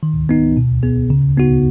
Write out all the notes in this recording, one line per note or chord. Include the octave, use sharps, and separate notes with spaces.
D#3
B3 D#4
B2
B3 G#4
C#3
B3 D#4 F#4